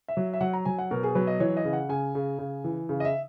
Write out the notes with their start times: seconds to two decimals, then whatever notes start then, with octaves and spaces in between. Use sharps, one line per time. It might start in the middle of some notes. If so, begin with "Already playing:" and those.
0.08 E5
0.17 F#3
0.34 E5
0.40 F#3 F#5
0.53 A#5
0.65 F#3 G#5
0.79 F#5
0.91 B2 A#4
1.03 G#4
1.15 F#3 B4
1.27 D#5
1.40 E3 C#5
1.57 D#5
1.65 C#3
1.73 F#5
1.89 C#3 G#5
2.15 C#3
2.39 C#3
2.64 E3
2.89 C#3
3.00 D#5
3.05 E5